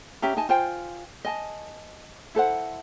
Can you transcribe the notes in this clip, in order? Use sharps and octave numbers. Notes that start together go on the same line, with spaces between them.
C#4 G4 E5 A#5
D#4 D#5 G#5 A5
F4 C5 G5 G#5
D#5 G#5 A5
E4 A4 C5 F#5